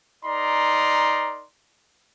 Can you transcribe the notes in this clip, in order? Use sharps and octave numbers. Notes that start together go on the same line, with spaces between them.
D#4 A#4 D5 A#5 C6